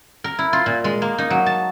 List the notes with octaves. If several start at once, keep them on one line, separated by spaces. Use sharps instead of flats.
A#4
E4
F4
A#2
G#3
A#3
D#4
F#3
A5